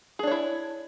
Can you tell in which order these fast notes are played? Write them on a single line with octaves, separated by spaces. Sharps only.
G#4 D4 C#5 E4